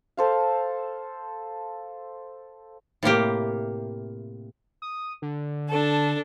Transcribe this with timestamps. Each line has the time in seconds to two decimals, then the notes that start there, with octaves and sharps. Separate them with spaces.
0.17 A4 C5 F5
3.03 A2 C3 A#3 G4
4.82 D#6
5.22 D3
5.68 D4 A4